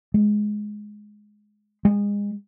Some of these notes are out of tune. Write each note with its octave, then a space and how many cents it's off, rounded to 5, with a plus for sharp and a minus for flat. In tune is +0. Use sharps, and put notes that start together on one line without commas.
G#3 +10
G#3 -30